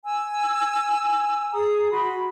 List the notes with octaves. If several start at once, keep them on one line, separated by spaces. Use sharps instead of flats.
G#5 E6
G#4 A#5 D#6
F#4 B5 C6